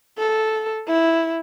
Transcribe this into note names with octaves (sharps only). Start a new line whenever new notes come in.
A4
E4